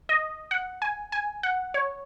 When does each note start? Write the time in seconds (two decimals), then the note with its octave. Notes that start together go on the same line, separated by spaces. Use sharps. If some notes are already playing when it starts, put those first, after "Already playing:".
0.09 D#5
0.51 F#5
0.82 G#5
1.12 G#5
1.43 F#5
1.74 C#5